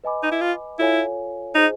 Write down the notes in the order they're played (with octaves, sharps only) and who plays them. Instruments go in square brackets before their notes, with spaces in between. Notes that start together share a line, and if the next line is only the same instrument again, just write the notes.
[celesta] B4 D#5 G#5 B5 D6
[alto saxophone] D#4
E4
F4
[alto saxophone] E4 [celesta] F4 A4 C#5 F5 G#5
[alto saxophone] D#4 [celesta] F4 G#4 C5 D#5 G#5